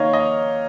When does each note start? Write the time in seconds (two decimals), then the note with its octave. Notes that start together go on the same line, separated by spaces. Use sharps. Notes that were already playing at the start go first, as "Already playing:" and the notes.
Already playing: D#3 A#3 D#4 C#5 D#5 F5
0.13 D#5